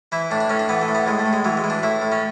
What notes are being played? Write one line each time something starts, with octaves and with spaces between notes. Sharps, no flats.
E3 E4
A2 D4
D4
A2 C#4
D4
E3 B3
A3
A2
B3
A2 G#3
A3
A2
G#3
E3 F#3
G#3
E3
D4
A2 E4
A2
C#4